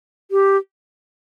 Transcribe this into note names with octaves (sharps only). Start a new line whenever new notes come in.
G4